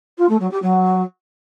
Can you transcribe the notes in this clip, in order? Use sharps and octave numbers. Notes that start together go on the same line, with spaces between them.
F4
A3
F#3
G4
F#3